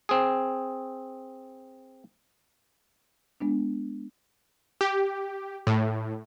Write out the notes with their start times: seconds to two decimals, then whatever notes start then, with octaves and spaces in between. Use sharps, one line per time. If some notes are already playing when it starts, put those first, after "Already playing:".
0.09 C4 G#4
3.41 G#3 B3 D4
4.81 G4
5.67 A2